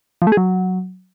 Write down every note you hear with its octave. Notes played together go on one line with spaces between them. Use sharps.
F3
A3
G#4
F#3